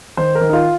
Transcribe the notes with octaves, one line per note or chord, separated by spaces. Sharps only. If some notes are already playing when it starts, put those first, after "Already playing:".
D#3 C5
A#4
D#3
D#4
F4